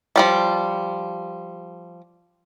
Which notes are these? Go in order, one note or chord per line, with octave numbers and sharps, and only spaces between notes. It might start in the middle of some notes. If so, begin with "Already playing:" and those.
F3 G3 A3